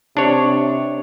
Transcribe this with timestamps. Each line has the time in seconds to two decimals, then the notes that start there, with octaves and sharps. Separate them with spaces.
0.17 C3 D4 C#5